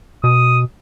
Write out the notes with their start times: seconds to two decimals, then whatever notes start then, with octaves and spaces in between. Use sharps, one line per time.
0.24 B2 D#6